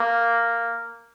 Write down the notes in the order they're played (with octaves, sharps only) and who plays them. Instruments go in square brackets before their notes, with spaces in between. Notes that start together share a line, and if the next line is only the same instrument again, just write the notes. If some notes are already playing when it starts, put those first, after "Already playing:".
Already playing: [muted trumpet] A#3